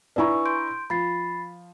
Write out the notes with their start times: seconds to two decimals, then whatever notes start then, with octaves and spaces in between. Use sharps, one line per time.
0.16 D4 E4 B4 G#5 A#5 C#6
0.45 C6 G6 D7
0.90 F3 B5 A6 C7